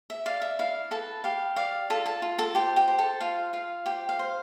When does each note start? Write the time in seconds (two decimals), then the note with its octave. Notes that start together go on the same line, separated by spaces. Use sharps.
0.10 E5
0.26 D5 F5
0.42 E5
0.59 E4 F5
0.91 A4 B4 A5
1.24 G4 F5
1.56 D5 F5
1.90 F4 A4 A5
2.06 A4 A5
2.22 F4
2.38 A4 A5
2.55 G4 C5 G5
2.76 G4 G5
2.88 C5
2.99 A4 A5
3.21 F4 F5
3.53 F4 F5
3.86 G4 C5 G5
4.09 F5
4.19 C5